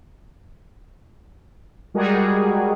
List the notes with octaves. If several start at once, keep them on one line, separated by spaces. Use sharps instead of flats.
G3 G#3 F#4 G#4 A#4